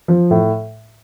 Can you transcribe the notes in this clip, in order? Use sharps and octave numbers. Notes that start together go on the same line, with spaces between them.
F3
A2